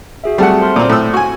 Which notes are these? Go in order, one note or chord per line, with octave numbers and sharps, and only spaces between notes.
F#4 G#4 E5
G3 A3 C4 E5 F#5 A5
C5 C6 F6
A#2 C4
A2 E6
F#4 G#5